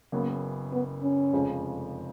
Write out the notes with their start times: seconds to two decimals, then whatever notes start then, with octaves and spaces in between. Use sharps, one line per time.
0.12 F#1 F#2 C#3 F#3 A#3 B3
0.73 B3
1.03 C#4
1.33 F1 F2 C#3 F3 G#3